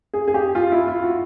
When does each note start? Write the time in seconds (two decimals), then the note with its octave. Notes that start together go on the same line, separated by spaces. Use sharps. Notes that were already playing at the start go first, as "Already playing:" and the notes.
0.14 G#4
0.28 G#4
0.34 G4
0.55 F4
0.72 E4
0.87 F4
1.03 F#4